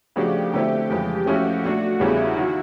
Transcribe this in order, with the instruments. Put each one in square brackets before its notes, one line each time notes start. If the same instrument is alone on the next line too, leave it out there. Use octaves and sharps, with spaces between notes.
[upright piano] C#3 F3 A3 D4 F#4 [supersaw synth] G4
[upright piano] D3 F#3 A3 C4 E4 [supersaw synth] G4
[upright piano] F2 C#3 E3 G#3 [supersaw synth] G4
[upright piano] F3 A3 C#4 E4 G4 [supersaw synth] F#4
[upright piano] A#2 F#3 A3 D4 [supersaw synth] F#4
[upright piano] E2 C#3 E3 G3 [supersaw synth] E4
[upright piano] D#3 F#3